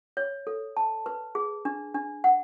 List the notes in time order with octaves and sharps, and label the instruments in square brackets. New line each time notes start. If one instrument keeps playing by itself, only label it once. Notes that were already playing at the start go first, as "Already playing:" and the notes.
[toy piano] C#5
A4
A5
B4
G#4
D4
D4
F#5